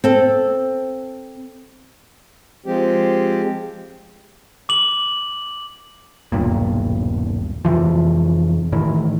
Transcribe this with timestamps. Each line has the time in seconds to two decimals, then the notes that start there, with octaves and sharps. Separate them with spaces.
0.04 C4 A4
2.66 F3 G#3 C4 G4
4.69 D6 F#7
6.32 D#1 B1 G2 A#2
7.65 F2 C3 E3 F3
8.72 A2 D#3 E3